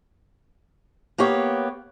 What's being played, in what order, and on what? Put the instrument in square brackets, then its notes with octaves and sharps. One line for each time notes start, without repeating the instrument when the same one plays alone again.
[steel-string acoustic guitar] A#3 B3 G4 C#5